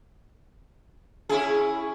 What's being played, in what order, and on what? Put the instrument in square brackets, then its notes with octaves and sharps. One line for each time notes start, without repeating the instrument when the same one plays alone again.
[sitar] C#4 E4 G#4